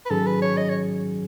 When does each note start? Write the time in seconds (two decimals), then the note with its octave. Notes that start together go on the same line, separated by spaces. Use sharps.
0.05 B4
0.10 G#2 D#3 F#3 C#4 G#4 A4
0.26 B4
0.42 C#5
0.58 D#5
0.69 C#5